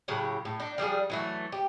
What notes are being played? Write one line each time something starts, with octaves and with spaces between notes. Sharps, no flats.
A2 C#3 F#3 G4
A2
D4 D#4
F3 G3 D4 G#4
E3 F#3 A3
G4